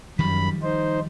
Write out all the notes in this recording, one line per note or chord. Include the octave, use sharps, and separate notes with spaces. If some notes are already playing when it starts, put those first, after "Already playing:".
F#2 D#3 F3 G3 B5
D#4 C5